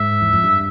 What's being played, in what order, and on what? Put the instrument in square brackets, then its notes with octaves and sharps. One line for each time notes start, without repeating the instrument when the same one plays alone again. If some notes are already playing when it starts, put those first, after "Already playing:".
Already playing: [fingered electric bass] G#2 [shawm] E5
[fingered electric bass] E2
F2
G2